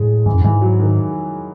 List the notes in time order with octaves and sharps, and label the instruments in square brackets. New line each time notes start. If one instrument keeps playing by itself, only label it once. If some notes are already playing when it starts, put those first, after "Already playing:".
Already playing: [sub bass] A2 [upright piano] G#3
[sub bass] G#2 [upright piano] E3
[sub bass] F#2
[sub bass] G#2 [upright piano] E3
[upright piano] F#3
D#3